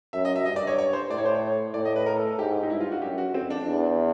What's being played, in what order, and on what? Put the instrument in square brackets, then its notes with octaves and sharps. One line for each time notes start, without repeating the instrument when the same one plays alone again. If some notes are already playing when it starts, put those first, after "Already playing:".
[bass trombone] F#2 [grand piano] E5
[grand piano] D#5
E5
[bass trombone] G2 [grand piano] D#5
[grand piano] D5
C#5
C#5
C5
[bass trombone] A2 [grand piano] D5
[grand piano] C#5
C5
C#5
[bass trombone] A2 [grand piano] D5
[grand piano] D#5
B4
A#4
A4
A4
[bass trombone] G#2 [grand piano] G4
[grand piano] G4
D#4
[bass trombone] G2 [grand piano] E4
[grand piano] F4
F#4
[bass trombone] F#2 [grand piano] G4
[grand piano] F#4
[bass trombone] F2 [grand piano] C4
[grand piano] D4
[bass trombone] E2